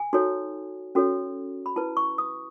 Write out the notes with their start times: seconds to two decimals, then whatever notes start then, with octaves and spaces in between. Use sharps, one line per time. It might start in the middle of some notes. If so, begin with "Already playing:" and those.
Already playing: G#5
0.13 D#4 F#4 A4 C#5
0.95 C#4 F#4 A4 C#5
1.66 B5
1.76 E4 B4 A5
1.97 C#6
2.18 D#6